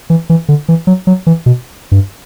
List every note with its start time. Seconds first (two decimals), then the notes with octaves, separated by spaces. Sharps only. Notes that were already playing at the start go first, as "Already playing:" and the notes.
0.10 E3
0.30 E3
0.49 D3
0.69 E3
0.87 F#3
1.07 F#3
1.27 E3
1.46 B2
1.92 G2